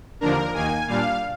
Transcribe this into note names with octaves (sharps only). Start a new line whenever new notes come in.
D#2 D3 F3 A#3 D4 A#4
D#2 D#3 A#3 G#5
A#2 G3 D4 F5